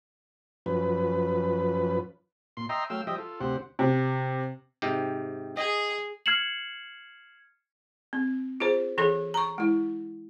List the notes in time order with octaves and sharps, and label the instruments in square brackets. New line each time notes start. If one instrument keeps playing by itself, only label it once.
[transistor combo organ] F#2 F3 B4
A#2 C6
D#5 E5 G5 A#5 C6
F#3 A3 F5 G5 E6
F3 G3 D#5 E5 G5
F4 A4
D2 C3 G4 C5 F#5
[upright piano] C3
[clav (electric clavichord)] G#2 C3 G4
[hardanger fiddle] G#4 [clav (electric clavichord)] D#5
[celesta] F6 G#6 C7 C#7 E7 F#7
[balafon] C4
F4 G#4 C5
E3 G#4 A4
A#5 C#6
G#3 E4